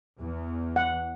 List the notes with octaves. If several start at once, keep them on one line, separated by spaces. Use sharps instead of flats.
E2
F#5